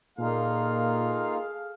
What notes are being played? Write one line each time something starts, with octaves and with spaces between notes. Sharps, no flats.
A#2 A#3 D#4 F4 G#4 A4 F5